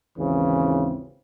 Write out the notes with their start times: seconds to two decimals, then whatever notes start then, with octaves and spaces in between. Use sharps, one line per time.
0.18 G#1 D#2 C#3 E3 C4